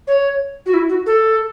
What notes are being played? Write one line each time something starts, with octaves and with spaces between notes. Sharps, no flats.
C#5
F#4
E4
F#4
A4